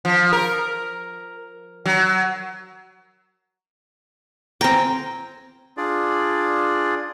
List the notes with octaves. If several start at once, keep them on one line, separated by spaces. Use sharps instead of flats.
F3
A#4
F#3
C4 G5 G#5 A#5 A#6
D4 F4 G#4 D5